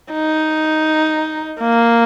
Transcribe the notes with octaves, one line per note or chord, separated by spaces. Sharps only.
D#4
A#3